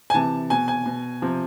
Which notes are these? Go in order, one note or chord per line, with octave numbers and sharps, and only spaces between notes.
G#5
C3 E3 A5
B2 G#5
G#5
B2
C3 F3